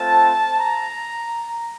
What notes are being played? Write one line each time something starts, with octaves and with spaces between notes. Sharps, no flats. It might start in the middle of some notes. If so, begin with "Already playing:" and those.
Already playing: A3 C4 F4 A5
A#5